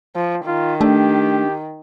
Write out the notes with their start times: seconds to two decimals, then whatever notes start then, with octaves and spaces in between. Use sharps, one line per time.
0.16 F3
0.47 D#3 F4
0.81 A3 D4 G4